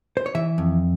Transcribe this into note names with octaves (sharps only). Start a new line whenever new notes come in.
C5
C#5
E3 E5
F2